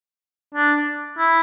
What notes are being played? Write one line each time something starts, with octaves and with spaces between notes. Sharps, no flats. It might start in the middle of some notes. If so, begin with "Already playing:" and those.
D4
E4